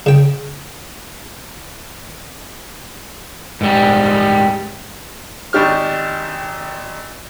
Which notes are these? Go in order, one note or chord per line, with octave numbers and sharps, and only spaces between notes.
C#3 G5
G#2 G3
G#1 D4 D#4 G4 C#6 F6